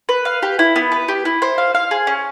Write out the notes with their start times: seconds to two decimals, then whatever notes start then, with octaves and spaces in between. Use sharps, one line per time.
0.09 B4
0.25 F5
0.43 G4
0.59 E4
0.76 B3
0.92 B4
1.08 G4
1.25 E4
1.42 C5
1.58 F5
1.75 F5
1.91 G#4
2.07 C#4